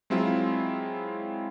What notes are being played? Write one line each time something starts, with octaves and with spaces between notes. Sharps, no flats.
F#3 G#3 C4 E4 F4